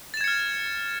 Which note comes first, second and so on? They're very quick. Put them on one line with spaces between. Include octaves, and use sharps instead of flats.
A6 E7 G#6 C#7 F6